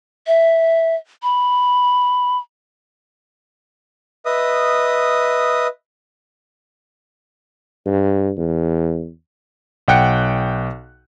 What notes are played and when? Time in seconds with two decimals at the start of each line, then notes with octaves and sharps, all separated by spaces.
0.27 E5
1.23 B5
4.26 B4 D#5 E5 D#6
7.86 G2
8.38 E2
9.88 B1 F#5 G5 F#6 C#7